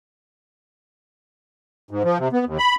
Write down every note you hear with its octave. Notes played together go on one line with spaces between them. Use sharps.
G#2
F3
C3
B3
D#2
B5